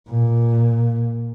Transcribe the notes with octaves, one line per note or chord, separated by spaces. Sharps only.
A#2